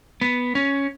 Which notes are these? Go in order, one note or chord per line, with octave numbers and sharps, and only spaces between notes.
B3
C#4